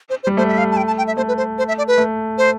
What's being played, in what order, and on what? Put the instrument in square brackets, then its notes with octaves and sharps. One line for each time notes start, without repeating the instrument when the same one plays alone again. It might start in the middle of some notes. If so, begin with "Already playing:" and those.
[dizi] C5
C5
[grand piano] G3
[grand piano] A3 [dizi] C5
[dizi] E5
F5
A5
G5
A5
G5
E5
[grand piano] A3 [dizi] C5
[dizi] B4
C5
C5
E5
D5
B4
[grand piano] A3
[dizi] C5